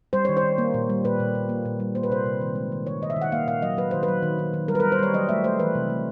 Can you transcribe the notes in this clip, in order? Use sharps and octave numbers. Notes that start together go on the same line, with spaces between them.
G3 C5
D#3 C#5
C5
D#3
A#3
A#2
G3
A#2 B4
A#2
A#2
A#3
A#2
G3
A#3 C5
B4
C3 C5
C3
D#3
G#3
D#3
D#3 C#5
D#3 D#5
E5
D#3
F#5
A#3 F5
A#2 F5
F#3 D#5
F#3 B4
D#3 C5
B4
F#3
D#3
D#3
D#3
G3 A#4
B4
A#4
G3
C5
G3 C#5
F#3 D#5
A3 E5
A3 C5
E3 B4
C3
A3